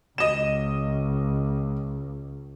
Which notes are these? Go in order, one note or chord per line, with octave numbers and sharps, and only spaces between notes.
C#2 D#5 E7